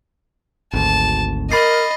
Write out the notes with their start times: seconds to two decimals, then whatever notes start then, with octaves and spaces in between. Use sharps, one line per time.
0.73 G#1 D2 A5
1.52 A#4 D#5 B5 A6 C7